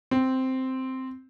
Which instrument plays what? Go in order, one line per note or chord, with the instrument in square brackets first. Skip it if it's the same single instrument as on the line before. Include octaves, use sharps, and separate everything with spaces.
[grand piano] C4